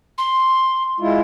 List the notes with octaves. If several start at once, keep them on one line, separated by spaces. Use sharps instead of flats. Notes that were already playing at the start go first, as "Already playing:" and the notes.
C6
G#3 E4 F4